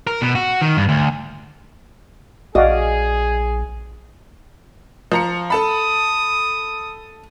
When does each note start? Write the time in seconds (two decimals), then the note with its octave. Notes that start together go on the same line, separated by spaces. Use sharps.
0.07 A#4
0.21 B2
0.35 F#4
0.61 D#3
0.77 G2
0.89 D2
2.55 A#1 F#4 G#4 D5 D#5 F5
5.12 F3 A#5 C#7
5.50 A4 A5 B5 D#6